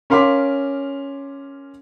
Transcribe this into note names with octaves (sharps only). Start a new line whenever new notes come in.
C#4 A#4 F5 C6 D6 B6